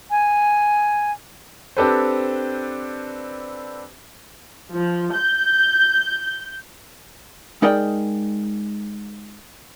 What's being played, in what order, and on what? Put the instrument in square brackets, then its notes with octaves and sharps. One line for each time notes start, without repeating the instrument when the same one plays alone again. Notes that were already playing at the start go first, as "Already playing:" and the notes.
[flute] G#5
[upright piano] C4 D4 G4 A4 B4 C5
[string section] F3
G6
[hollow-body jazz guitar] G#3 D#4 A#4 D5 D#5 G5